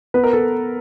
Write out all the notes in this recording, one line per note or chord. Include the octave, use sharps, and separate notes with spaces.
B3 B4
A#4
A4